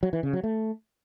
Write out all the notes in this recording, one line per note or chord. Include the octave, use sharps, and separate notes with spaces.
F#3
E3
C#3
F#3
A3